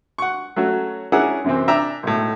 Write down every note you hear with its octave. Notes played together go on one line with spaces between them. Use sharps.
F#5 C#6
F#3 A3 C#4 F#4
C#4 D4 E4 G#4 A#4 F#5
F#2 C3 E3 C4
D4 E5 G5 A#5
B1 A2